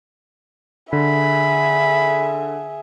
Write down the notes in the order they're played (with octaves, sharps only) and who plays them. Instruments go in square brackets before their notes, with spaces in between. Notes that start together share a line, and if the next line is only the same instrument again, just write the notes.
[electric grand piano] D3 [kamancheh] G#4 E5 [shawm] B5